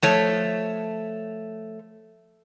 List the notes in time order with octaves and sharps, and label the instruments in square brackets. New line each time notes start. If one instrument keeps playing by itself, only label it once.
[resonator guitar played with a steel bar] F3 A3 C#5